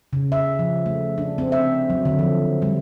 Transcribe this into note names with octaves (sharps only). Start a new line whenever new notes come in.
C#3
E5
F3
A3
D4
C4
E5
F#3
D3
F3
G3